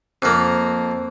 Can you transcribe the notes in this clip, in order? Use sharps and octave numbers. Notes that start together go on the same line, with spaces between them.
F2 A#3